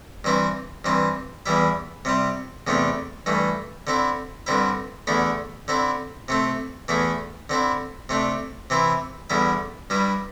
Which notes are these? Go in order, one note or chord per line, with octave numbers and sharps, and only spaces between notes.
G2 E3 C4 E4
G2 E3 C4
E2 E3 G3 E4
C3 G3 C4
E2 C3 A3 D4
G2 E3 A3
D3 C4 E4
G2 D3 C4 E4
E2 D3 A3 E4
D3 C4 E4
C3 A3 C4
E2 E3 A3 E4
D3 C4 E4
C3 A3 D4
C3 E3 C4 E4
E2 D3 G3 E4
G2 G3 E4